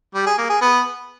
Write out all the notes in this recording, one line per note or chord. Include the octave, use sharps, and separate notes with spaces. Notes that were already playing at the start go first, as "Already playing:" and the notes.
G3
G#4
A#3
G#4
B3